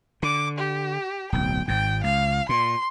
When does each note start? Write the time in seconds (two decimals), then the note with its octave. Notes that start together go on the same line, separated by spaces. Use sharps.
0.23 D3 D6
0.58 G4
1.32 D1 B1 G5
1.68 G#1 G#2 G5
2.04 C#2 F5
2.49 A#2 C6